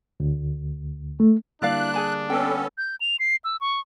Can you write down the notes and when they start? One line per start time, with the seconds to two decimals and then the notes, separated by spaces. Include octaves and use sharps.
0.20 D2
1.20 A3
1.62 D3 G3 A#3 D4 E4 D5 F5 F#6
1.94 G#4 G#5 A5
2.30 B3 C#4 A4 G5
2.78 G6
3.00 F7
3.19 C7
3.44 E6
3.61 C#6